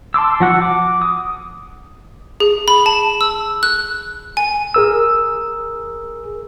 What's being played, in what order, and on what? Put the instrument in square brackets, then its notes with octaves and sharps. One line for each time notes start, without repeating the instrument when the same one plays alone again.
[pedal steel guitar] A5 C6 D6 E6
F3 F#4 F#5
D6
D#6
[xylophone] G#4
B5
A5
E6
F#6
G#5
[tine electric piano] G#4 A#4 E6